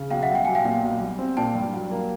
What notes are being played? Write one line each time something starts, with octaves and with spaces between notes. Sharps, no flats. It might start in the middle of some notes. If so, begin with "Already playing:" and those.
Already playing: C#3
B1 F5 G5
E5 F#5
G3
G5
B1 G#5
F5 G5
A#2
B1
G3
C4
A#2 G5 A5
G2
F#3
A#3